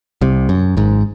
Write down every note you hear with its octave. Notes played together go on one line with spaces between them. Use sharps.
C2 C3
F#2
G#1 G#2